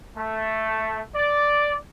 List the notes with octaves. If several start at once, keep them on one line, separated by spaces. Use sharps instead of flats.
A3
D5